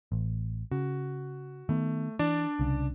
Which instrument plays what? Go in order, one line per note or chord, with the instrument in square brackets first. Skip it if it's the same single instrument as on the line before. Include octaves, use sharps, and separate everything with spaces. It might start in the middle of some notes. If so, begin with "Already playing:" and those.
[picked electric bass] A1
[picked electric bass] C#3 [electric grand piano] F#4
[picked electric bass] D#3 B3 [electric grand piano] A3
[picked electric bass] E3 [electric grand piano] D4 D5
[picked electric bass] C2 C#3